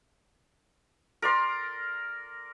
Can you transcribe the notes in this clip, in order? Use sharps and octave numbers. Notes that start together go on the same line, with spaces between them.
A#4 D5 C6